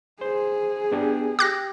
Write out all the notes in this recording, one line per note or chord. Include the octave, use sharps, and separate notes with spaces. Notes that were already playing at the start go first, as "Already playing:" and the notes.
G#4 C5
B3 D4 G4
G4 G5 D6 F#6 A#6